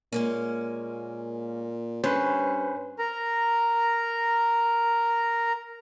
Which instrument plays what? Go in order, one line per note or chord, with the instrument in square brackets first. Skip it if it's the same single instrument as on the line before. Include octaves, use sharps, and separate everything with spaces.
[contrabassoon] A#2 [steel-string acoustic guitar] G#3 A#3 C#4
[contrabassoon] G2 [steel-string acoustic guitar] C4 [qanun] C#4 [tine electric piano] B4 C5
[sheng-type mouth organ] A#4 A#5